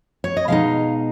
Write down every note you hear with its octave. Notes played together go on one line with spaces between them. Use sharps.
C#5
D#5
B2 G#3 D#4 F5